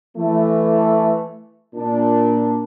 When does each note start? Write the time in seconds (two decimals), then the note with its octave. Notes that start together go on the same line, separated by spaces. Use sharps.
0.17 E3 A3
1.76 A#2 D4